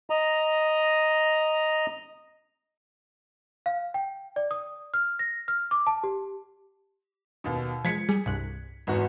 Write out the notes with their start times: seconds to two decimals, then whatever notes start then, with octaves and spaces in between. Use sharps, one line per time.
0.10 D#5 A#5
3.66 F5
3.94 G5
4.36 D5
4.51 D#6
4.94 F6
5.19 A#6
5.48 F6
5.71 D6
5.87 A5
6.04 G4
7.44 D#2 B2
7.85 F3 G#3 G#6 B6 C#7
8.09 G3 G#4
8.26 C2 G2 F#6
8.87 G#1 E2 F#4